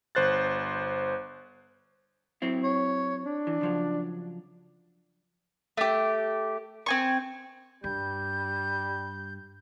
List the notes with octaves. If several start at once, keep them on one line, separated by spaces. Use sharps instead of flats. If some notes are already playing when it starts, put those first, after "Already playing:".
G1 C5 F#6 A6
F#3 C4 E4
C#5
D4
E3
C#3 F3 F#3
A3 G4
C4 G#5 C#6
G2 G3 G6